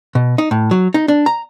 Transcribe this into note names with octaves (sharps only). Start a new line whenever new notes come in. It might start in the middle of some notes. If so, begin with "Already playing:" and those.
B2
D#4
A2
F#3
D#4
D4
A#5